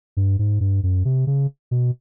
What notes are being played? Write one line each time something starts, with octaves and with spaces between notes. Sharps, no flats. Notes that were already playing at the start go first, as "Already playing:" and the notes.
G2
G#2
G2
F#2
C3
C#3
B2